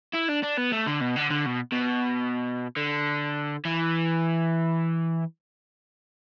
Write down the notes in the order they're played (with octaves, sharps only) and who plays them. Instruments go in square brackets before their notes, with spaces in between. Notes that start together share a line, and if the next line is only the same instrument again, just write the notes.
[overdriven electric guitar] E4
D4
D4
B3
A3
D3
B2
D3
D3
B2
B2
D3
E3